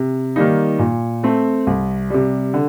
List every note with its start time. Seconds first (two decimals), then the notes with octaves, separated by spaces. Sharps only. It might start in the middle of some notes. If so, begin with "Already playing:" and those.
Already playing: C3
0.36 D#3 G3 A#3 D#4
0.79 A#2
1.23 A3 C4
1.67 C2
2.10 C3 G3
2.54 D3